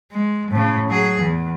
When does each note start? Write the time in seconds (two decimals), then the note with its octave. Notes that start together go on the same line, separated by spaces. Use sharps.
0.12 G#3
0.52 A2 C#3
0.89 F#3 G#4
1.20 E2